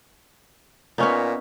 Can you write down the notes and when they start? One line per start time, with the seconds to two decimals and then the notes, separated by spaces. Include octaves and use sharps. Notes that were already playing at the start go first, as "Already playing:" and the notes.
0.98 A#2 B3 C#4 D#4